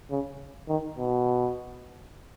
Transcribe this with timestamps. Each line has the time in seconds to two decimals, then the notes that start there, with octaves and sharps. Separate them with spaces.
0.11 C#3
0.68 D#3
0.98 B2